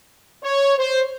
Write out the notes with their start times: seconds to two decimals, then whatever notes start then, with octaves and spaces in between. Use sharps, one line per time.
0.42 C#5
0.78 C5